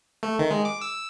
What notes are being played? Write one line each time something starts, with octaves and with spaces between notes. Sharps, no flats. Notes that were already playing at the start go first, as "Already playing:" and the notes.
A3
D#3
G#3
D6
E6